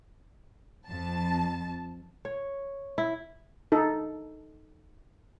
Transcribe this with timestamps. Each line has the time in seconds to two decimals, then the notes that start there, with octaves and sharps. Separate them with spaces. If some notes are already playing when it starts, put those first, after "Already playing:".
0.88 F2 A5
2.25 C#5
2.98 E4
3.72 D#4 A4